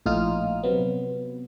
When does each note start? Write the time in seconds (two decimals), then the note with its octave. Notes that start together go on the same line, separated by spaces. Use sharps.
0.06 A#1 A2 D#4 F4 D#6 F6
0.63 C3 F#3 B3